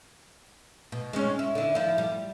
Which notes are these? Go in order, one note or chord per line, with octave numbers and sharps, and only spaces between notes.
B2
G#3 C4 C#4
E4
D3 E4
F3 E4
G3